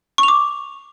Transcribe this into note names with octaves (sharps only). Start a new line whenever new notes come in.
C#6
F7
D6